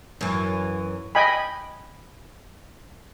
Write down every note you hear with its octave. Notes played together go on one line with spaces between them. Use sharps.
F#2 E3
D#5 G5 G#5 B5